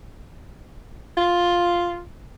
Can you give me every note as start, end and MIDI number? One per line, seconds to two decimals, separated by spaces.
1.17 2.03 65